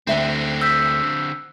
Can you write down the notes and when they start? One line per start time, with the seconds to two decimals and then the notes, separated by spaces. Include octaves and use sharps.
0.07 D2 D3 C4 E5 G5
0.62 E6 G6 B6